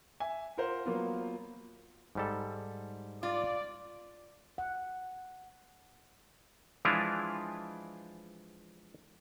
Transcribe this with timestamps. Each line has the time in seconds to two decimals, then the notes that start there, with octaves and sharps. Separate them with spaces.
0.20 E5 G#5
0.57 F4 A#4 C5 F#5
0.86 F#3 A#3 B3 F4
2.15 G#2 G3 A4
3.23 F4 D5
4.58 F#5
6.85 E3 F3 G#3 D4 E4 F4